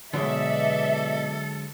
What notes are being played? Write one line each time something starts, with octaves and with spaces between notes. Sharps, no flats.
B2 D3 F#3 G#3 A4 D5 E5